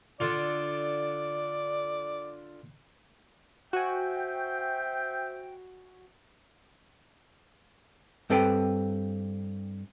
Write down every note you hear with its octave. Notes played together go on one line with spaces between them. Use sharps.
D3 F4 D5
F#4 C5 E5 G5 G#5
G2 C4 A4 B4 G5